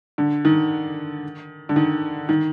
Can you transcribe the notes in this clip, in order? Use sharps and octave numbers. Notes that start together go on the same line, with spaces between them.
D3
D#3
D3
D#3
D#3